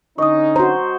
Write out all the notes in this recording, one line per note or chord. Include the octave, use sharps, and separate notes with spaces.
D3 C#4 D#4 D#5 C#6 D#6
F#4 C5 A#5